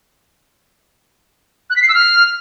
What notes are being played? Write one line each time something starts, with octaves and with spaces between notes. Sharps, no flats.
F#6
B6
C7
E6
F6